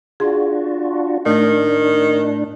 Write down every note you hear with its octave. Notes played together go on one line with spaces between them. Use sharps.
D4 F4 F#4 G#4 C6
A2 D#3 A3 D4